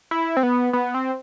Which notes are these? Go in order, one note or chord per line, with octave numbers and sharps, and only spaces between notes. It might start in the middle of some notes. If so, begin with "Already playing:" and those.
E4
C4
B3
B3
C4